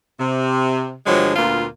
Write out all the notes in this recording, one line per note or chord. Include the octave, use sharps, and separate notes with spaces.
C3
G2 D3 F3 F#3 G#3
D2 A#2 A#3 B3 F4